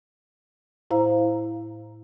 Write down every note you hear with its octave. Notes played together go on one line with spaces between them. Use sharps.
A2 E4 C5 F5 A#5